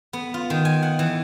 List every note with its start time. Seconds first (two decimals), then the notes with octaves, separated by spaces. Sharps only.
0.13 B3
0.34 F4
0.50 D#3
0.65 G#5
0.83 F#5
0.99 E3